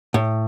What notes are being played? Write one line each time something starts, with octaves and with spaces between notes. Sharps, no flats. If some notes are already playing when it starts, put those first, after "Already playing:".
A2